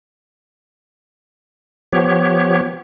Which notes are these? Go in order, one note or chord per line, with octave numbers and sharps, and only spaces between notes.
F3 B3 G4 C#5